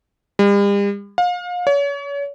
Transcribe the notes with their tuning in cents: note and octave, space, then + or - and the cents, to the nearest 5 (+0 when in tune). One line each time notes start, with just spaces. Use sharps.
G3 +45
F5 +35
C#5 +35